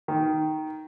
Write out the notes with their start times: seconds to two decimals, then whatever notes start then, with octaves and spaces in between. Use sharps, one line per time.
0.08 D#3